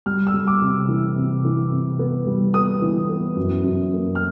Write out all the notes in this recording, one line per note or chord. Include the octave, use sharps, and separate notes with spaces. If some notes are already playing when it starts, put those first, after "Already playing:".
G3 F6
E6
G3
D6
C3
E3
C3
E3
C3
B3
G3
B3 D#6
E3
B3
F#2
F#2
A#3
F6